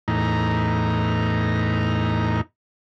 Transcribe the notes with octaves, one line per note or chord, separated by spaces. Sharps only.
E2 A2 D#4 A#5